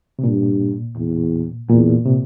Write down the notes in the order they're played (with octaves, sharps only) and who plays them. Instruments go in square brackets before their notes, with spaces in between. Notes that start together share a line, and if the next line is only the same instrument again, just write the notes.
[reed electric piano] C3
[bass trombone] G2 [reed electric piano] A#2
[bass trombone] E2
[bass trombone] E2 [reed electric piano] A#2
[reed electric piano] C3